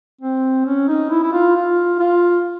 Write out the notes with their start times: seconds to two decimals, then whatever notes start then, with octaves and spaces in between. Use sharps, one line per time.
0.21 C4
0.66 C#4
0.88 D#4
1.10 E4
1.23 E4
1.32 F4
1.56 F4
1.99 F4